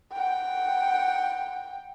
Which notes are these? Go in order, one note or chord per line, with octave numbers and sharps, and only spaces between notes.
F#5 G5